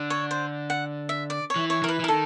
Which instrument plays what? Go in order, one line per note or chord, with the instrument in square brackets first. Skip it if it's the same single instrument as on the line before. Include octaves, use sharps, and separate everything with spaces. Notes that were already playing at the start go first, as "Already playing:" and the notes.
Already playing: [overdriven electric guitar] D3
[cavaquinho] C#5
C5
F#5
E5
D5
C#5
[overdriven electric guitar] E3
[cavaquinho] C#5
[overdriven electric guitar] E3 [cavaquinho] A#4
[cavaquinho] B4
[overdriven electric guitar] E3 [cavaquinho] A#4
[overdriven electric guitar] D#3 [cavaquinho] A4